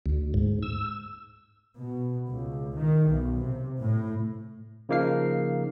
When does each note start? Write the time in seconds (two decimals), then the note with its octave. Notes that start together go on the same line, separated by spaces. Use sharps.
0.06 D2
0.34 G#2
0.62 E6
1.77 B2
2.28 C#2
2.76 D#3
3.08 B1
3.42 C3
3.82 A2
4.89 C#3 F3 A#3 D#4 F5 C7